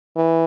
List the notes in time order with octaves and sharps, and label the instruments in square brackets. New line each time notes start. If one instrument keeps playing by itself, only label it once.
[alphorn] E3